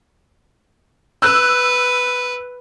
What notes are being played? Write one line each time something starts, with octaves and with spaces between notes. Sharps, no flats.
B4 E6 F#6